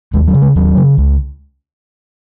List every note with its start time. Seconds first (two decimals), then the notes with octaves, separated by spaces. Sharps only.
0.14 D#2 G#3
0.28 F#3
0.34 C#3
0.42 G#3
0.55 D#2 F#3
0.77 C#3
0.98 C#2